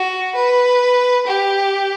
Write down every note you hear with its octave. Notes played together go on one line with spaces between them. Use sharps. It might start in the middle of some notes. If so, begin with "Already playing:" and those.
Already playing: F#4
B4
G4